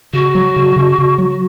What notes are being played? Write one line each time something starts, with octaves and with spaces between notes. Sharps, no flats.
C#3 F#4
F#3
C#3
C#3
C#3
F#3